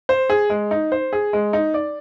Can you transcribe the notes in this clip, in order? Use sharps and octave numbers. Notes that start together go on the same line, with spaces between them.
C5
G#4
G#3
D#4
C5
G#4
G#3
D#4
D5